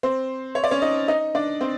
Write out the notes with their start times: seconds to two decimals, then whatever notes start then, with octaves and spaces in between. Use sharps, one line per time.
0.03 C4 C5
0.55 C#5
0.64 D5
0.71 C#4 C#5
0.82 D#4 D#5
1.08 D#4 D#5
1.35 D4 D5
1.61 C4 C5